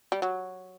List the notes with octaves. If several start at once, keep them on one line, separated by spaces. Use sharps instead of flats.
G3
F#3